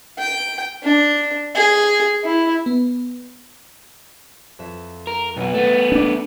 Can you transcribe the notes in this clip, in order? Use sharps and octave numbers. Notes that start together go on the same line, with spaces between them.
G5
D4
G#4
E4
B3
F2 E5
A#4
B1 B3 B4 D#5 F#5
A3 B3
C#4 D4 A4 D6